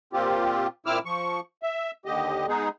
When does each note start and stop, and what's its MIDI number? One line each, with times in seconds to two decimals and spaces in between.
0.13 0.67 46
0.13 0.67 60
0.13 0.67 65
0.13 0.67 67
0.86 0.99 46
0.86 0.99 60
0.86 0.99 64
0.86 0.99 86
0.86 0.99 88
0.86 0.99 89
1.05 1.40 53
1.05 1.40 85
1.63 1.91 76
2.06 2.46 39
2.06 2.46 50
2.06 2.46 67
2.06 2.46 75
2.48 2.69 56
2.48 2.69 59
2.48 2.69 63
2.48 2.69 68